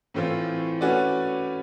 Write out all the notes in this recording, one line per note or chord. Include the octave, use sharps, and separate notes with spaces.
A2 E3 A3 C4 F4
A3 C#4 F#4 B4 D5